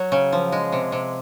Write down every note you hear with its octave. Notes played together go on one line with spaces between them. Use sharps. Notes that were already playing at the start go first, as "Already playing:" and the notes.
Already playing: F#3
C#3
F3
G#3
C3
C3